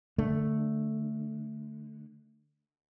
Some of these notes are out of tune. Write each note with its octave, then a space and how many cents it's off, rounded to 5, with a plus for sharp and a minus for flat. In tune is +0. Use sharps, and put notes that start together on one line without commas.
D3 +5 A3 +0